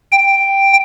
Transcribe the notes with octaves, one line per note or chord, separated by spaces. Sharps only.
G5